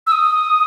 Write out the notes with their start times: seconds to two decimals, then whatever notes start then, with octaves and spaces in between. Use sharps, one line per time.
0.07 E6
0.12 D#6